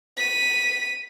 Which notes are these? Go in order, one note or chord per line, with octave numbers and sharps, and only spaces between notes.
B6 D#7